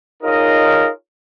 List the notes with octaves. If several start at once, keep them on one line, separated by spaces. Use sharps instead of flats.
D#4 F4 G#4 A#4 C#5 D#5